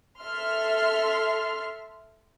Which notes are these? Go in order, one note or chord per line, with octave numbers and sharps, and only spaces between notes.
A4 E5 C6 F6